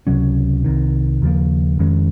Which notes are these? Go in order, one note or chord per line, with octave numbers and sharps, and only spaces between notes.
C#2 C3 F#3 C#4
C2 C3 D#3
D#2 C#3 F3 A#3
F2 D#3 G#3 C#4